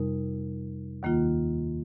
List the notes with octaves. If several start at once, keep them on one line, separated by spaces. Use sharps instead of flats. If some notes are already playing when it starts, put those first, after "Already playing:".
Already playing: F2 C3 G3 D#4 A#4
D#2 D#3 A#3 F4